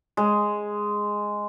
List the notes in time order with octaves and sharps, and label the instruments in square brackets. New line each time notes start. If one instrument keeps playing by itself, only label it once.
[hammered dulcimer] G#3